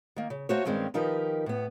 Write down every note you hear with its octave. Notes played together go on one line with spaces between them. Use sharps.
D#3 A#3
C#3
A3 A#3 F#4 C5 C#5
G2 D#3 G#3 A#3 C4 C#4
D#3 F3 D#4 G4 A#4 B4
A2 B3